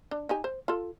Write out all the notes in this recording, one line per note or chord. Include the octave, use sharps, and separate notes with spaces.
D4
D#4 G4 G#5
C5
F4 A4